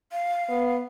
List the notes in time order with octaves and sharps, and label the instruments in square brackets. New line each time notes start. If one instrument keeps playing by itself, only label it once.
[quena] F5
[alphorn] B3